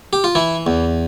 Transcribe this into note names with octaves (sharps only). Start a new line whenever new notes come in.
G4
F4
E3 E4
E2